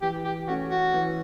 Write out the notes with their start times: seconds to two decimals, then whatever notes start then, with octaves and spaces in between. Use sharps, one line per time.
0.01 E3 G4
0.25 G4
0.47 A3 C#4 F#4
0.70 F#4
0.93 E3